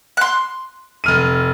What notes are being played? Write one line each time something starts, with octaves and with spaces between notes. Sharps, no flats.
C6 F#6
F1 F6 D#7